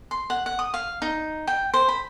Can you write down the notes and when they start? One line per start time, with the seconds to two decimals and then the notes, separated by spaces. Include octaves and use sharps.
0.11 C6
0.30 F#5
0.46 F#5
0.59 D#6
0.74 F5
1.02 D#4
1.47 G5
1.74 C5
1.88 B5